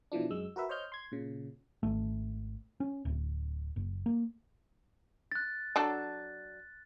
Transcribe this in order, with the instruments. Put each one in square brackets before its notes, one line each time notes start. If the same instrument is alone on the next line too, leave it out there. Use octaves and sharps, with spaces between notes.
[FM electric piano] B2 E3 F3 D4
F#2 G#3 E6
F#4 A#4 B4 E5
C5 C#5 D#5 F6 G6
C6 G#6
A#2 C#3
[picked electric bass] G#1 A3
C#4
D1
F#1
A#3
[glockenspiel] F#6 A6
[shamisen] F#3 D4 A4